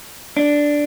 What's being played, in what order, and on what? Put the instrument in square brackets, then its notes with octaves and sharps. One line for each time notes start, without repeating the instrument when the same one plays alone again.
[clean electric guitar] D4